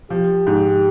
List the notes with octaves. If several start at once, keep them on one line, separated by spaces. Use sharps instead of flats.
F3 G4
G#2